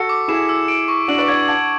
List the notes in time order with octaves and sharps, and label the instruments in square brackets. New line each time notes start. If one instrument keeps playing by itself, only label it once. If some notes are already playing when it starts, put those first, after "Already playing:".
Already playing: [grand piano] F#4 A4 [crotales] C#7
[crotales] D6
[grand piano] E4 G#4 [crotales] E7
[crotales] E6
D7
C#6
[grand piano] D4 F#4 [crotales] F#7
[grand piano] B4 D5
[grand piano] D5 F#5 [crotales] G#6
[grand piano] F#5 A5 [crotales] G#6